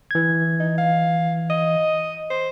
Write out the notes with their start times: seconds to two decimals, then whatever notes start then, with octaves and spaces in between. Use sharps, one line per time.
0.11 E3 G#6
0.60 D#4
0.78 F5
1.50 D#5
2.30 C5